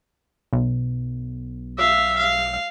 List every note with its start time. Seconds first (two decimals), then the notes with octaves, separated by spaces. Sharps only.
0.53 B1
1.78 E5 F5
2.18 F5